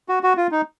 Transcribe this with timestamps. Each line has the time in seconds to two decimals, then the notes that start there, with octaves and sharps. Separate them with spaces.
0.09 F#4
0.23 F#4
0.37 F4
0.51 D#4